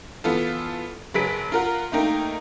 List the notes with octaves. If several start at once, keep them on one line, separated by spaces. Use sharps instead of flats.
E3 B3 F4 A4
F#1 F#3 G#4 B4 B6 D7
F4 A#4 F#5
A3 A#3 D#4 A#4 G5